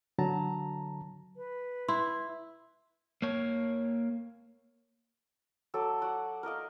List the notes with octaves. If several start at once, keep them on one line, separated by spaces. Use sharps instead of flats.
D3 F#3 A5 A#5
B4
E4 C6
A#3 C#5
F#3 A4 D6
F#4 D5 F#5
A#4 D5 D#5 F5